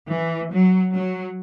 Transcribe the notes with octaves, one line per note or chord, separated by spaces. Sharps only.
E3
F#3
F#3